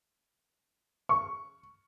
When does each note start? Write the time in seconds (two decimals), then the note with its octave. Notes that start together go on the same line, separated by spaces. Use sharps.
1.09 C#6